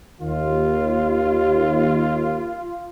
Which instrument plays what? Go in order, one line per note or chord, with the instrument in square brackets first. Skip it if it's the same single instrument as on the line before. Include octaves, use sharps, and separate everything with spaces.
[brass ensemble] D#2 [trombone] F4